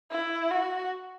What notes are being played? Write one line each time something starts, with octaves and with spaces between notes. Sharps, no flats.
E4
F#4